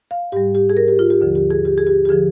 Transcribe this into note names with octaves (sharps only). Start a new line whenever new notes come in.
F5
G#2 G3 G4
G4
G#4
A#4
G4
F4
G4
D#2 D3 F3
G4
G#4
G4
G#4
G4
G4
D3 F3 G#4